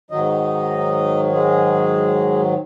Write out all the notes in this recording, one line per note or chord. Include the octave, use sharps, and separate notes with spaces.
G#2 D#3 F#3 D#4 D#5
G#3 G#4